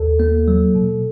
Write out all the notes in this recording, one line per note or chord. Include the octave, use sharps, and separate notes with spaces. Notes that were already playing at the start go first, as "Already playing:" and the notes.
Already playing: D#2 A4
A#3
F#3
B2